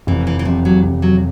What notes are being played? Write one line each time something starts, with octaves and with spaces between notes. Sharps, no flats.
F1 E3
E3
E3
E2 C3 F3
F#3
F1
F#3